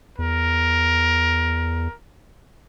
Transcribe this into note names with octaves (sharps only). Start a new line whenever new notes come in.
E2 A#4